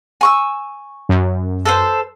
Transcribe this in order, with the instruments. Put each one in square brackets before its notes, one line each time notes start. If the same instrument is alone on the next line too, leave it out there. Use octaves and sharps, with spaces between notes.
[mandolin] G#5 C#6 E6
[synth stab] F#2
[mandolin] A4 B4 C5